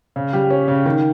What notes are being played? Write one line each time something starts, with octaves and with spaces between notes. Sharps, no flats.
C#3
G3
C#4
C#3
D#3